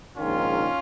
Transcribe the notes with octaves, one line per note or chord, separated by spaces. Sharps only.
A#1 G#2 D#3 C#4 F4